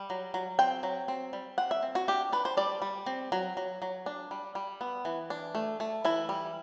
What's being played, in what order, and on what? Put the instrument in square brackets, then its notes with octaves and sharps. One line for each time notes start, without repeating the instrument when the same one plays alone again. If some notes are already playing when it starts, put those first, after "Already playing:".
Already playing: [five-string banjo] G3
F#3
F#3
C4 G5
F#3
C4
G3
C4 F#5
E5
C4
F#4
D4 G4
D4 B4
C5
G3 D5
G3
C4
F#3
F#3
F#3
D4
G3
G3
B3
E3
D4
A3
A3
E3 E4
G3